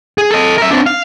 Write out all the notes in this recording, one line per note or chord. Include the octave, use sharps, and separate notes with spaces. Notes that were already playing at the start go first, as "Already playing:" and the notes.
G#4
A4 D#5
A#4 E5
C4 D4
F5